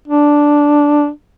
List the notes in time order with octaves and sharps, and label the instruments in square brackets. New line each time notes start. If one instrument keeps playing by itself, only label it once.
[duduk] D4